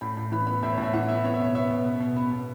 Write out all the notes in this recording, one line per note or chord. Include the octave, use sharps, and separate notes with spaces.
A2 B5
A2
E3 B5
B3 B5
A2 E5
C#5
A2
E5
E3 F#5
B3 E5
B3 C#5
E5
B2 C#5
B3 E5
B2
B3
B2
B3 B5
B2